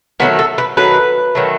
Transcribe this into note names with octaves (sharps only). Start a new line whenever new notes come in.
D#3 F#3 A3 B3
A4
B4
D#3 F#3 A3 B4
D#3 F#3 A3